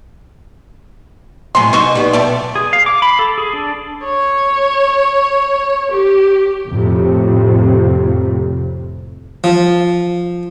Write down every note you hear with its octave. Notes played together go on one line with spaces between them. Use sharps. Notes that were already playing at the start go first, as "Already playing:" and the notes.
A2 C3 F#3 G#5 C6
B2 D#4 C5 C#6
G3 B3
B2 A3 D5 G5
G#4
F5
D6
B5
A4
G#4
D4
C#5
G4
F2 A2 C3
F3